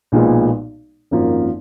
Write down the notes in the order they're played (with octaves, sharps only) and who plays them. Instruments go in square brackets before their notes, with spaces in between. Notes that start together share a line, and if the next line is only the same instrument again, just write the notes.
[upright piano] B1 A#2 F3 G#3 B3
G#1 F#2 F3 A#3